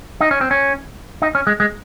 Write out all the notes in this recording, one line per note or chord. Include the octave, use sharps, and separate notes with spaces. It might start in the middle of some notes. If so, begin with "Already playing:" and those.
D#4
C#4
C4
C#4
D#4
C#4
G#3
G#3